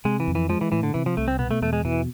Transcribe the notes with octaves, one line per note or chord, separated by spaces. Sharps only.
C3 G#3
E3
F2
E3
F3 G#3
E3
A2 E3
D3
C3 E3
F3
C2 A3
C4
B2 B3
A3
E2 A3
G#3
B2 E3